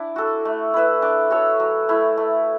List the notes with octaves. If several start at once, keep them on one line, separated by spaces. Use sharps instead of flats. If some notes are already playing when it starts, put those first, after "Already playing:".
Already playing: D4 E4
F#4 A4
A3
E4 B4 E5
D4
F#4 A4 C#5
F#3
A3 E4
A3